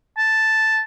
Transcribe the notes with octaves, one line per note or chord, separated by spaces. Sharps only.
A5